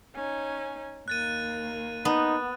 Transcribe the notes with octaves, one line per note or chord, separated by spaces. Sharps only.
C#4 D#4 G#5
D#2 A#3 F#6 A6 D#7
B3 D#4